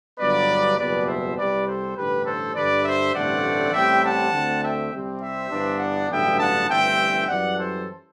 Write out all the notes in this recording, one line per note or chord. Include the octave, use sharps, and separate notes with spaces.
G1 G2 F#3 B3 B4 D5
F#1 E2 B2 G3 B4 D5
C5 E5
C2 C3 G3 C4 B4 D5
A4 C5
A1 G2 D3 G4 B4
A4 C5
G2 D3 G3 D4 B4 D5
C5 E5
A1 G2 D3 A3 C4 D5 F#5
A1 A2 G3 C4 E5 G5
F#5 A5
D2 D3 A3 C4
E5 G5
C2 C3 G3 C4
C5 E5
G1 G2 E3 B3 D4
D5 F#5
A1 G2 D3 F#3 B3 E5 G5
F#5 A5
G1 G2 E3 A3 C4 E5 G5
F#2 E3 G3 D5 F#5
A4 C5